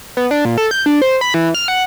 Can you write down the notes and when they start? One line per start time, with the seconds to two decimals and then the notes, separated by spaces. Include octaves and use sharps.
0.17 B3
0.31 D4
0.45 A#2
0.58 A4
0.71 G6
0.86 D4
1.02 C5
1.21 B5
1.34 E3
1.55 F6
1.68 F#5